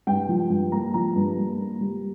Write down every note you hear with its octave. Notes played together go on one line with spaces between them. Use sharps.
G2 G5
F3
G2
A#3 A#5
F3 A#5
G2
A#3
A#3
G3